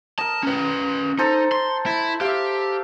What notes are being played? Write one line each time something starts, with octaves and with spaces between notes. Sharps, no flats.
A#4 D#5 A5
C#4 B4
D#4 A4 C5 A#5
C6
E4
G4 E5 F5